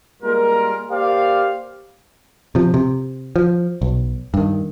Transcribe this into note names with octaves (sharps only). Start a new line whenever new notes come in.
G3 G#3 A#3 F4 A#4
A#3 G4 C5 D5 F5
C3 F3
C3
F3
B1
G2 D#3